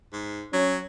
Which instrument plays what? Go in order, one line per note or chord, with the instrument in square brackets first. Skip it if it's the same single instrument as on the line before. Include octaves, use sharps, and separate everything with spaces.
[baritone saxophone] G#2
[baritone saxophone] F#3 [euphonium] C#4